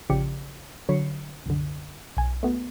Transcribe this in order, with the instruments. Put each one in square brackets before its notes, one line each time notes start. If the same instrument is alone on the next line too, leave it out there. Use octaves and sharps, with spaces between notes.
[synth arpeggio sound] A1 C#3 F3 G4 D5 C#7
D3 F#3 C#5 B5 C7 C#7
C2 F#2 D3
B1 G#5
A3 B3 F#4